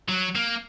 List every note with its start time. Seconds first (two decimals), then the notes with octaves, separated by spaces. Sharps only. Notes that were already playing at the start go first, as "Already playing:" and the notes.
0.09 F#3
0.35 A#3